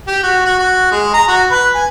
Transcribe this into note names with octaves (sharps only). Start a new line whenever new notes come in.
G4
F#4
F#4
F#4
G#3
A#5
F#4
B4
G#5